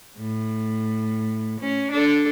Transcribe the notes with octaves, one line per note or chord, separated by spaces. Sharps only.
A2
C#4
D4 A4